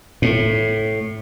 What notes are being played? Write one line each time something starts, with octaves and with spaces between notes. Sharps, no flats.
A2